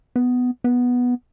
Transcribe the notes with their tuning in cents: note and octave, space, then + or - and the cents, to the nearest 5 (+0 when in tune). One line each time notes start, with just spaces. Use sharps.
B3 +10
B3 -5